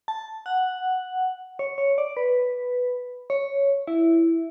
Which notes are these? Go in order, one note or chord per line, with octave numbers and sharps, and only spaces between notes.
A5
F#5
C#5
C#5
D5
B4
C#5
E4